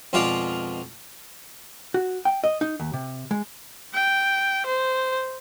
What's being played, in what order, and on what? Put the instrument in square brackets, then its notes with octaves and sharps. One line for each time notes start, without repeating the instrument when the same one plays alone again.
[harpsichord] F2 B2 G#3 F4 D5 F5
[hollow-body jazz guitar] F#4
G5
D#5
D#4
D#2
C3
G#3
[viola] G5
C5